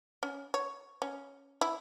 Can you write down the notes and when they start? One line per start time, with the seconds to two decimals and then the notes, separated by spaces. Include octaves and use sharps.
0.23 C#4
0.54 C#5
1.02 C#4
1.61 E4